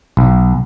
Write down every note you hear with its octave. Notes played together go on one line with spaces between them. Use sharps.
B1